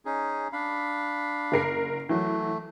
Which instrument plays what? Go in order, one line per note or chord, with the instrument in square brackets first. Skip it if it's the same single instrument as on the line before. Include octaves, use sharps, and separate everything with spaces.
[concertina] C#4 D#4 G#4
D4 F5 B5
[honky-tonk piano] F#1 A#4 C7
[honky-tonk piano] E3 F#3 [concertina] A3